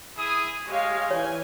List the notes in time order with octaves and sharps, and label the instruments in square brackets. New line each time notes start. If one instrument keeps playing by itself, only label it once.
[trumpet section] E4 G#4 D#6
[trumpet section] G#3 [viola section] G4 C#5 F5
[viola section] E3 G#5 [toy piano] C#5